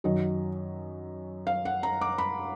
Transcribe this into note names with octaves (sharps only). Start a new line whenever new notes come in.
F#2 D#3 F#3 D#5
F5
F#5
A#5
D6
B5